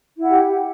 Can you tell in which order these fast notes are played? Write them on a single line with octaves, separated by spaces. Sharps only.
E4 F#5 G4